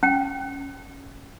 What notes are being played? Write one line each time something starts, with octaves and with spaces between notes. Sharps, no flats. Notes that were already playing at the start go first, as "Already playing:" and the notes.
C#4 G5